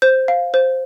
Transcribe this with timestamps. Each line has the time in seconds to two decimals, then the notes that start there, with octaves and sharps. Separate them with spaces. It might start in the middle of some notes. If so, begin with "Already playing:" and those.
0.02 C5 G6
0.28 F5
0.54 C5